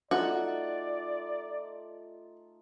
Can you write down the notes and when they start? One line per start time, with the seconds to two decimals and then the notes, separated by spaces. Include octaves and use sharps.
0.11 A3 D#4 F4 F#4 D5